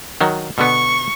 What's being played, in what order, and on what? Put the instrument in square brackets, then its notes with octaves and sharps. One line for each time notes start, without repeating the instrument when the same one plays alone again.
[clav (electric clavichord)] D#3 F#3
[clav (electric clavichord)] B2 D3 B3 [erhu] C#6